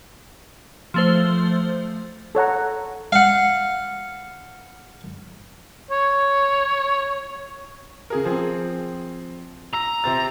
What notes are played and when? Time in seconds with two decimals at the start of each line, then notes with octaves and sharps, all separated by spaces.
0.94 F3 A3 C5
2.35 A4 C#5 F#5 A#5
3.12 F5 F#5
5.91 C#5
8.10 C#3 G#4 A#4
8.24 F3 C4 G#4
9.73 A#5 E6
10.04 C3 C4 A6